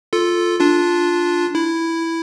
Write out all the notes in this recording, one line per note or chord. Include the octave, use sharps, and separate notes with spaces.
F4 A4
D4 F4
E4